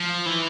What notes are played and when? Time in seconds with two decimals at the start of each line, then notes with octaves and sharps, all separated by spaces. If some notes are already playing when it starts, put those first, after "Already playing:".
Already playing: F3
0.26 E3